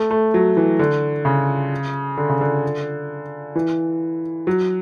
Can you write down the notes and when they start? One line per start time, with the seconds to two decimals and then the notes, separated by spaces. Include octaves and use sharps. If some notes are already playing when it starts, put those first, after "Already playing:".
Already playing: A3
0.11 A3
0.34 F#3
0.57 E3
0.79 D3
1.25 C#3
2.17 D3
2.29 C#3
2.41 D3
3.56 E3
4.47 F#3